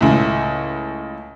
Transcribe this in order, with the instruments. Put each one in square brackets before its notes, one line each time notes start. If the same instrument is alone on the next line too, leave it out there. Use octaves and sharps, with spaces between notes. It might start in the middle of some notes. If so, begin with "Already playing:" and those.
[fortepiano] C#2 A2